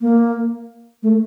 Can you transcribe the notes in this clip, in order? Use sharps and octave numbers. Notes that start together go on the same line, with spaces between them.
A#3
A3